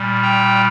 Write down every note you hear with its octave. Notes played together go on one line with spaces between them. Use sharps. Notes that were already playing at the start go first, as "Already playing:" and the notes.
Already playing: A#2 G3
G5 A#5